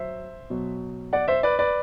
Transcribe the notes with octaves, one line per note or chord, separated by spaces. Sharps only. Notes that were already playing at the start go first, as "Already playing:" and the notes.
Already playing: F#3 C5 E5
B2 F#3
D5 F#5
C5 E5
B4 D5
B4 D5